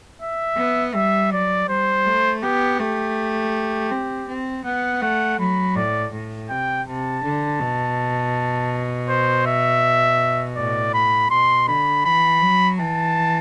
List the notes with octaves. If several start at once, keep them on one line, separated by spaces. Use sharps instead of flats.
E5
B3
G3 E5
F#3 D5
G3 C5
A3
B3 G4
A3 G4
C4
C4
B3 F#5
A3 F#5
F#3 B5
A2 D5
A2
C3 G5
C3 A5
D3
B2
C5
E5
A2 D5
B5
B2 C6
D3 B5
E3 B5
F#3
E3 A5